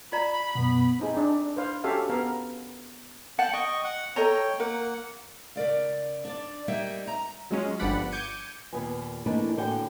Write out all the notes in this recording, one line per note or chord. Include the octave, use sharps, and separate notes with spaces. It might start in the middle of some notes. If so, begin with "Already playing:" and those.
F4 D5 A#5 B5
F#2 B2 B3
C4 D#4 G#4
D4
B4 C5 F5
C#4 F#4 G4 A4 E5 F5
B3 A#4 F5
F#5 G5 A5 F#6
D#5 G5 C#6
F#5
A4 C#5 D#5 G5 A#5
A#3 A#4 F#5
C#3 A#4 D5 F5
D4 D5
G3 A#3 D#4 E5 G5
A#5
F#3 G#3 C#4 F4
G1 G2 F3 D5 F#5 B5
D6 G6 G#6 C#7 D#7
D#2 A#2 B3 B4 G#5
E3 A3 A#3 D4 D#4
A2 D3 A#3 F#4 G5 G#5